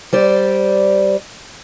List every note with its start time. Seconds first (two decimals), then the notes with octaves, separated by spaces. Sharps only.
0.13 G3 C5 D5